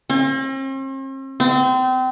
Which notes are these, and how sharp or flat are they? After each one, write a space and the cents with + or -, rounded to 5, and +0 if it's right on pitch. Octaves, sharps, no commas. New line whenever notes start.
C4 +45
C4 -30